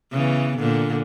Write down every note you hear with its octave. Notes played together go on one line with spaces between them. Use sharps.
C#3 E3 B3
A#2 D3